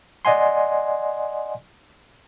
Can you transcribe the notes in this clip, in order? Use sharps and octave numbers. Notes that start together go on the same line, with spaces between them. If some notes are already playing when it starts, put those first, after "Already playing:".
D5 D#5 F#5 G#5 C6